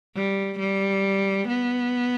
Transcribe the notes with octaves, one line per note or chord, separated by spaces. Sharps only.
G3
G3
B3